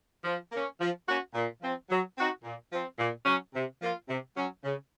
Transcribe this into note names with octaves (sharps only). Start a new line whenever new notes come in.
F3
A#3 C#4
F3
A#3 C#4 F#4
A#2
F3 C4
F#3
C4 D#4 F#4
A#2
F3 C4
A#2
F#3 C#4
C3
F3 A#3 F4
C3
F#3 C#4
C#3